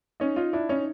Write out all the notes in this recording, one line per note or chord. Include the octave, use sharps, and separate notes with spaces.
C#4 D#4
D#4 F4
D4 E4
C#4 D#4